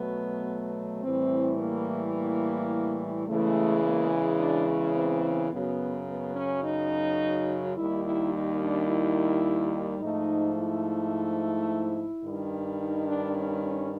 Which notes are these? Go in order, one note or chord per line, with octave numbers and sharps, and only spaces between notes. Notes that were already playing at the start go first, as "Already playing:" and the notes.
Already playing: B2 F#3 A3 B3
A2 E3 G3 C4
A#3
A#3
E2 C#3 E3 G#3 A3
A#3
D4
C#4
C4
F#2 C#3 F#3 B3
B3
C#4
D#4
D#2 D#3 G3 E4
E4
D#4
D4
E4
G#2 F3 A3 D#4
E4
G2 D#3 G3
D#4
D4
C#4
C#4